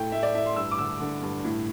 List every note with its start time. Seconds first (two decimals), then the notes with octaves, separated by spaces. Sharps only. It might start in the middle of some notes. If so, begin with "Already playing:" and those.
Already playing: A2 A3 G5
0.12 A2 E5
0.23 D5
0.35 A2 E5
0.45 C6
0.56 G2 E6
0.71 D6
0.78 D3 E6
1.00 D3
1.22 G2
1.44 A2